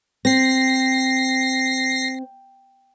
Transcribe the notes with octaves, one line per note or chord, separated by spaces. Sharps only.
C4 A#6 C7